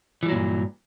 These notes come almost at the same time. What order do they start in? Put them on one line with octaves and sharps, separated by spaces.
E3 G3 F#3 A#2 G2